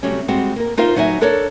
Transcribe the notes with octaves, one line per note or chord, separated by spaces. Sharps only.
C3 F#3 G3 A3 C#4
G3 G#3 C4 F#4
A#3 A#4
D#4 F4 A#4 C5 F5
D2 F#3 D#4 D5 E5 G#5
D4 A4 A#4 C#5 D5